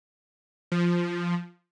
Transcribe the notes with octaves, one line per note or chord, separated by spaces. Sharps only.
F3